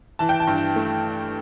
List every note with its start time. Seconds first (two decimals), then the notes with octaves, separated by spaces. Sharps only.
0.19 E3 A5
0.29 G5
0.40 A5
0.47 G2
0.76 A3